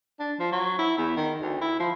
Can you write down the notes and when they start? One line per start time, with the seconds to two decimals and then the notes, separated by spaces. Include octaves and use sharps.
0.19 D4
0.39 F3
0.52 F#3
0.79 E4
0.98 E2
1.17 D#3
1.41 D2
1.61 E4
1.80 F3